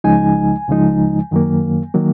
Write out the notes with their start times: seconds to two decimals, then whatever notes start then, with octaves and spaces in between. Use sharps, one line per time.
0.04 C#2 C#3 F3 G#3 D#4 G#5
0.68 C#2 C#3 F3 G#3 D#4
1.31 F#2 D#3 F#3 A#3
1.94 D#3 F#3 A#3